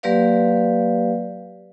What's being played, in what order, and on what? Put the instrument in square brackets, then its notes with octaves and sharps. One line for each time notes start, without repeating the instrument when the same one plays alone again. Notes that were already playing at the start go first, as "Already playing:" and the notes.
[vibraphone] F#3 A#3 G4 B4 D5 F5